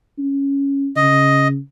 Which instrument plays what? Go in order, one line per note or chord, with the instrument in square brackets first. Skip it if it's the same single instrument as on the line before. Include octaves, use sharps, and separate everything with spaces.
[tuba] C#4
[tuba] C#3 [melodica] D#5